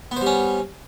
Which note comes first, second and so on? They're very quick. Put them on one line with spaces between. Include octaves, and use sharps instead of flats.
B3 C5 G3 C#4